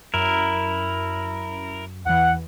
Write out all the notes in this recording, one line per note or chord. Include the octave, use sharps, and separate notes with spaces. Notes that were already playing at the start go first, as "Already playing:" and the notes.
F#2 E4 A#4
E2 E3 F#5